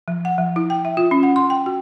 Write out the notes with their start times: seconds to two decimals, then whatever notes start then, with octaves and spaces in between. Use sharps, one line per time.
0.08 F3
0.25 F#5
0.38 F3
0.56 E4
0.70 G5
0.85 E5
0.97 F4
1.11 C#4
1.23 F#5
1.36 C6
1.50 G5
1.66 F#4